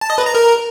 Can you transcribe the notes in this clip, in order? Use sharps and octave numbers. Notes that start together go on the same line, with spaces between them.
A5
D#5
B4
A#5
A#4